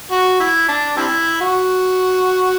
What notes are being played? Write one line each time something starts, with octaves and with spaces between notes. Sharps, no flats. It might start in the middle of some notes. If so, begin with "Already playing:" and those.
F#4
E4
D4
G3 C4 E4
F#4